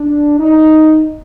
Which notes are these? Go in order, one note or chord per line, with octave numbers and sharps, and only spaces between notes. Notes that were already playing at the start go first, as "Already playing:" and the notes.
Already playing: D4
D#4